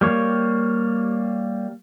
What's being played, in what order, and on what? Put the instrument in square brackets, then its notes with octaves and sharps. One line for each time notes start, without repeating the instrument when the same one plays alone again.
[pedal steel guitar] G3 A#3 C#5